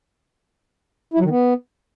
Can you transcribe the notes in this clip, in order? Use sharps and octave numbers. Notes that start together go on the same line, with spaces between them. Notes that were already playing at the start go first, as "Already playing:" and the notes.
E4
F#3
D#3
B3